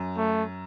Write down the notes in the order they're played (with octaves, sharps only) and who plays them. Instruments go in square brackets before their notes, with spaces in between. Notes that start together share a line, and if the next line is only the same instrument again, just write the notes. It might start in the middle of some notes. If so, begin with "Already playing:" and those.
Already playing: [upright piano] F#2
[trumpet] A3